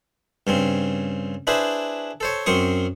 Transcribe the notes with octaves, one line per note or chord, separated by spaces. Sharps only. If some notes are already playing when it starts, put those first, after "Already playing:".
G2 C#3 C4
D4 E4 G#4 B4 C5
A4 C5 C#5
F#2 C4 C6 C#6 D#6